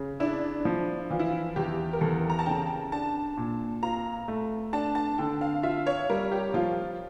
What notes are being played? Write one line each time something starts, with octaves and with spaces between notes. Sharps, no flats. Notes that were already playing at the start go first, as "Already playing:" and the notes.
Already playing: C#3
D4 E4
F3
E3 F4
E4
F4
E2 G4
A#4
E2 A4
A#5
A5
C#3 G5
D4 A5
A#2
F4 A#5
A3
D4 A5
A5
D3 G5
F5
F4 E5
C#5
G3 A#4
G4
F3 F4